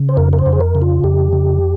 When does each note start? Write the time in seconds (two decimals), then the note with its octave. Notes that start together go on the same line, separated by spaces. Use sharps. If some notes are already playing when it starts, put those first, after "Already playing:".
Already playing: C#3
0.09 C5
0.17 F2 A#4
0.33 A#4
0.39 C5
0.46 F2
0.53 G#4
0.60 A#4
0.75 C#3
0.82 F4
1.04 F2 G4
1.33 C#3